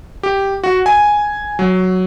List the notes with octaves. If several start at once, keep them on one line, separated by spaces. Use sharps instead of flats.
G4
F#4
G#5
F#3